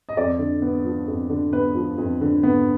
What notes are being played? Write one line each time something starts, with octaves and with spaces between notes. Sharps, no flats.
D#5
F2 D5
D3
B3
F3
F2
D3
B3 B4
F3
F2
D3
B3